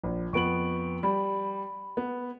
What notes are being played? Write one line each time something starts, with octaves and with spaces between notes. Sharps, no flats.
A#1
F2 B3 C#6 D7 F#7
G3 B5
B3